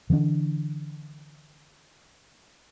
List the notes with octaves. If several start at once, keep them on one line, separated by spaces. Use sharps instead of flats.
D3 E3 A3 D4